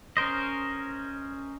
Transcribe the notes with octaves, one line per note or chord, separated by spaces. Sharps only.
C#4 A#4 C5 D#5